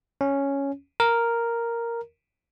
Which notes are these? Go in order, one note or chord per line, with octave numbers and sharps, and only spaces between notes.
C#4
A#4